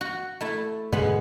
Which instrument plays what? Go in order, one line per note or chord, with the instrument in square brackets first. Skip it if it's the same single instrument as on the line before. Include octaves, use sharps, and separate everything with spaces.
[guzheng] F#4
A3 E4
[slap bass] G#2 B2 D3 [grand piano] G#3 [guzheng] B3 B5